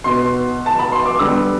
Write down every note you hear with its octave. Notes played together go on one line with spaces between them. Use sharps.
B2 B3 C6
A5
B5
C6
D6
D3 G3 B3 E6